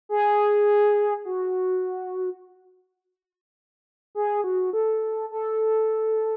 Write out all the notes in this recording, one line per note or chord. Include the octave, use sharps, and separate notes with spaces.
G#4
F#4
G#4
F#4
A4
A4